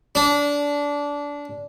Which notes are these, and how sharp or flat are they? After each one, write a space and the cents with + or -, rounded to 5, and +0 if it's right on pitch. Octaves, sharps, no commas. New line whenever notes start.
D4 -20